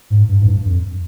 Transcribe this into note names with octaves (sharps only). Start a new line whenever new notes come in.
G#2
G2
G#2
G2
F2